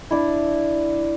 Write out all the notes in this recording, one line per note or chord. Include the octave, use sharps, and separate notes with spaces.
D4 E4